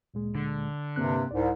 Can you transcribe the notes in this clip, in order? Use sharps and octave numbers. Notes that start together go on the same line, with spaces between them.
D2 A#2 G#3
D3
G2 C3 A#3 C4 F#6
C2 G#2 D5